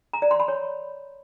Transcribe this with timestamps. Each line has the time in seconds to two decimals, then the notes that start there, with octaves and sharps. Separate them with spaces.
0.13 A#5
0.22 D5
0.31 C6
0.40 B5
0.48 C#5